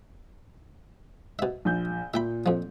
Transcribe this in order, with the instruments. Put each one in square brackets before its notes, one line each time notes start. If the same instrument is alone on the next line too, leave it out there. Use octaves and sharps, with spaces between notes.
[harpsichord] B2 E5
[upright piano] A#1 G6
[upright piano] A#2 [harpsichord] E5 G5 B5
[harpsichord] F2 F3